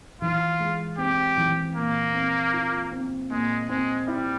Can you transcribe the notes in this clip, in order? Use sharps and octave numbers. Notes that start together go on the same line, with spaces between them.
E3 F4
G#3
C4 G4
E3
A#2 A#3
C4
F4
C4
A#2 G#3
G#3 C4
G3 E4